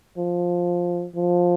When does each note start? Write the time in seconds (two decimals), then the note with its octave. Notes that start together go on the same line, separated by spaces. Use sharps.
0.17 F3
1.16 F3